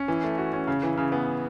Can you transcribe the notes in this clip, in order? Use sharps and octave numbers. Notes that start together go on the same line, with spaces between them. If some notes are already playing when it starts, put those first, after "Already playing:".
Already playing: C#4
E3
A3
F#4
C#4
C#3
E3
C#3
B3